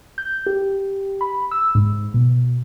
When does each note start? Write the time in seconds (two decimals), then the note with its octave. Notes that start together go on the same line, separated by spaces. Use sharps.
0.18 G6
0.46 G4
1.21 B5
1.51 E6
1.75 G#2
2.14 B2